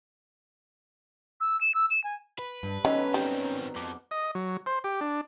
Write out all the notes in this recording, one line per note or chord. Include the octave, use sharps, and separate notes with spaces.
E6
E7
E6
E7
G#5
B4
G2
B2 D3 D#3 F#3 C#4
D#3 G3 C4 D#4
F2 D6
D#5
F#3
C5
G4
D4